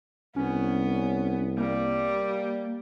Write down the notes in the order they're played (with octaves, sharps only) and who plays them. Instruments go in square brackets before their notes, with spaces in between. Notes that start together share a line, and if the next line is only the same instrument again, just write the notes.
[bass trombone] C2 [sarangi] B3 [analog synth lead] C#4
[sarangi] G3 [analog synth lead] A#3